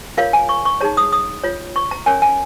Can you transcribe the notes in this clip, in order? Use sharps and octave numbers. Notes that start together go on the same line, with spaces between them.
F4 A#4 C#5 F5
G#5
C#6
C#6
D#4 G#4 C#5 A#5
D#6
D#6
F4 C#5
C#6
A#5
C#4 A#4 C#5 G#5
G#5